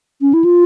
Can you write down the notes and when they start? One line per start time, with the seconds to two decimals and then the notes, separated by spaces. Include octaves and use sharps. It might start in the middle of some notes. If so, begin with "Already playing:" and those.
0.21 C#4
0.34 E4
0.44 F4